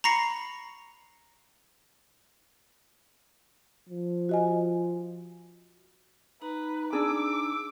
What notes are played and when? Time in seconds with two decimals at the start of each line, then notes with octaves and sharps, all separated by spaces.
0.04 A#5 B5 C#6 A#6 C7 C#7
3.89 F3
4.29 F#4 D#5 G#5
6.42 D#4 B4 A#5
6.93 D4 G#4 D6 E6